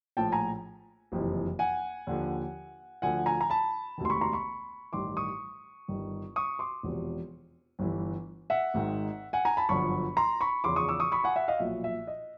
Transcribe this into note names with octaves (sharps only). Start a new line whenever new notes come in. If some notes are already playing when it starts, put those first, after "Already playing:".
A#1 A2 F3 G5 A5
G#5 A#5
F#1 F2 C3 E3
F#5 G#5
D#2 D3 F3
D2 D3 F3 F#5 G#5
G#5 A#5
A#5
A5 B5
E1 D2 C3 D#3
C6
B5 C#6
A#5 C6
B5 C#6
A1 G2 D#3 C6 D6
C#6 D#6
G1 G2 D#3
C#6 D#6
C6 D6
E1 E2 C3 F3
G1 G2 E3
E5 F#5
G#1 G#2 D#3
F#5 G#5
G#5 A#5
A5 B5
G1 F#2 D3 F3 B5 C#6
A#5 C6
B5 C#6
E2 C#3 F3 C6 D6
C#6 D#6
D6 E6
C#6 D#6
B5 C#6
F#5 G#5
E5 F#5
D#5 F5
B1 A#2 F3 E5
E5
D#5